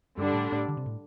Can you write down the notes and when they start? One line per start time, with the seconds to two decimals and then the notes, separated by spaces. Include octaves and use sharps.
0.17 G2 D3 G3 D4
0.34 A2
0.52 A2
0.68 D3
0.77 C3
0.86 A2